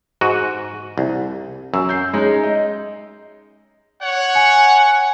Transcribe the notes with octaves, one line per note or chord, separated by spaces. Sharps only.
G#2 F#4 D#7
C2
F#2 E6
G6 C7
G#3 C#4 D#4
D#5
C#5 F#5
G#5